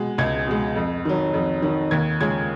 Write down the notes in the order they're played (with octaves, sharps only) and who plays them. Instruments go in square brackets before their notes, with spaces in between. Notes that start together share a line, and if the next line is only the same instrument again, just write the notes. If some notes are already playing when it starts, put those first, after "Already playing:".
Already playing: [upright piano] B2 G#3
C#2 G#6
B2 G#3
F2
D#3 F#3
F2
D#3 F#3
D#2 G#6
C#3 F3 G#3 G#6